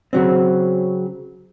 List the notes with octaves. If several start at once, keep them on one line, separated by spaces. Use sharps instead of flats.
C#3 F#3 C4